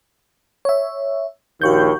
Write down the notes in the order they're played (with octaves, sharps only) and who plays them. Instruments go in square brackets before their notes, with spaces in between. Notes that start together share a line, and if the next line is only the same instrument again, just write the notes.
[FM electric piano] C#5 E5
[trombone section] A#1 D#2 A#3 [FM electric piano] F#4 C#6 G6